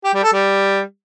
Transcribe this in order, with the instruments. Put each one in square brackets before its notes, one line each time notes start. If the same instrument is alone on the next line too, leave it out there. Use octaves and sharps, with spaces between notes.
[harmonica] G4
G3
A4
G3